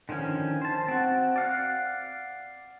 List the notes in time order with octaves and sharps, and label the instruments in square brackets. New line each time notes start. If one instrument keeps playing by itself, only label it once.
[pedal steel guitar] D3 D#3 F3 C#4
C5 A5
C4 F#4
D5 F5 F#5